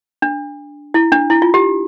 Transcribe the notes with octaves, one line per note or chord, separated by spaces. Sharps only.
D4
E4
D4
E4
F4
G4